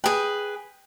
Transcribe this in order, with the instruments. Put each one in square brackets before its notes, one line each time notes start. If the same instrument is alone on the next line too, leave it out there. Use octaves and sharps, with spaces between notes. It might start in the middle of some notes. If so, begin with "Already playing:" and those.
[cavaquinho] G#4 B4 [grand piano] G5